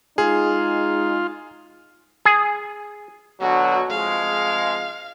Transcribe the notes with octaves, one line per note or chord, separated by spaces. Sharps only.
G#3 D#4 F4 G#4
G#4
B2 D3 F#3 F#4
F2 G#3 F5